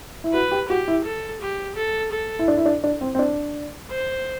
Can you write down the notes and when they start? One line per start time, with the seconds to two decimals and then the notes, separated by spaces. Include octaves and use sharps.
0.24 E4
0.33 F#4 B4
0.51 G4
0.69 F#4 G4
0.88 E4
1.04 A4
1.41 G4
1.76 A4
2.12 A4
2.39 E4
2.48 D4
2.57 E4
2.66 D4
2.84 D4
3.01 C4
3.15 C4
3.19 D4
3.90 C5